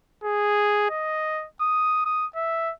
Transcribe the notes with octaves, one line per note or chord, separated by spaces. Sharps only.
G#4
D#5
D#6
D#6
E5